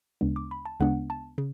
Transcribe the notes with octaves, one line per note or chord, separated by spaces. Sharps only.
D2 C#3 G#3 B3 D4
D6
B5
A5
D2 C#3 G#3 B3 D4 F#5
A5
C#3